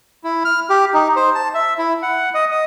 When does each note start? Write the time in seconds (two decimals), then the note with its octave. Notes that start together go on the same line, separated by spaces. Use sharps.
0.24 E4
0.45 F6
0.70 G4
0.94 D#4
1.16 C5
1.35 A5
1.54 E5
1.79 E4
2.02 F#5
2.34 D#5
2.51 D#5